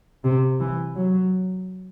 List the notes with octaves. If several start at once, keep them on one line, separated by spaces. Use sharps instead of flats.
C3
E3
F#3